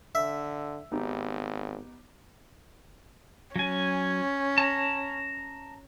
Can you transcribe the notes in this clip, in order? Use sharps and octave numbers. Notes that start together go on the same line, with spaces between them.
D3 E5
G#1 B3 D#4 G4
F#3 C#4 G#5
A5 A#5